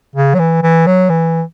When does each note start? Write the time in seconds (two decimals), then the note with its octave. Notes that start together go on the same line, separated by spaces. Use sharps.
0.15 C#3
0.34 F#3
0.39 E3
0.62 E3
0.87 F#3
1.09 E3